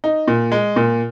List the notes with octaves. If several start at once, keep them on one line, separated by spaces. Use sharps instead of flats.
D#4
A#2
G#3
A#2